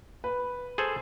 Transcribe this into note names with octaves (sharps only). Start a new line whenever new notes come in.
B4
G#4 A4 C5